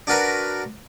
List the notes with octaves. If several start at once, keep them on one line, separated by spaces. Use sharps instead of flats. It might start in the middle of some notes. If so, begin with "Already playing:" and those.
D4 F#4 A#4 B4